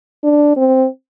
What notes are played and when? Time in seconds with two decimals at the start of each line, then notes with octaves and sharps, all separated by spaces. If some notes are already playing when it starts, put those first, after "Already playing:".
0.24 D4
0.57 C4